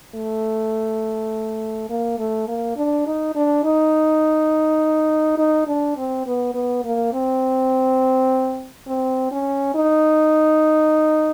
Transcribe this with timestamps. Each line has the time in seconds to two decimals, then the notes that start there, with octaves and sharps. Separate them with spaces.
0.15 A3
1.90 A#3
2.19 A3
2.48 A#3
2.76 D4
3.07 D#4
3.35 D4
3.64 D#4
5.38 D#4
5.67 D4
5.97 C4
6.27 B3
6.54 B3
6.85 A#3
7.13 C4
8.87 C4
9.32 C#4
9.75 D#4